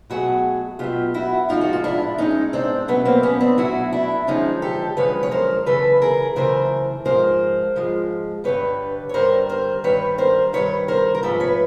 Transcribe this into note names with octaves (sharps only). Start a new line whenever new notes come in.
B2 F#3 A3 F#4 G#4
B2 F#3 A3 F4 G4
E4 F#4
A2 F3 G#3 D#4 F4
F#4
F4
D4 E4
A2 F3 G#3 C#4 D#4
C4 D4
B2 F#3 A3 B3 C#4
A#3 C4
B3 C#4
C4 D4
B2 F#3 A3 E4 F#4
D4 E4
F#2 D3 F3 G#3 C#4 D#4
G4 A4
F#2 D3 F3 G#3 B4 C#5
C#5
A#4 C5
F#2 C#3 E3 A3 A4 B4
G#4 A#4
F#2 C#3 E3 A3 A#4 C5
G#2 F3 G#3 A#4 C5
G#2 F3 G#3
G2 D3 G3 B4 C#5
C#5
G2 D3 G3 A#4 C5
A#4 C5
G2 D#3 G3 B4 C#5
A#4 C5
G2 D#3 G3 B4 C#5
A#4 C5
A#4
G#2 F3 A3 A4 B4
B4 C#5